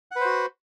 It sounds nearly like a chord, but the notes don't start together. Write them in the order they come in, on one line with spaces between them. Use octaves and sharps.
F#5 B4 C5 F#4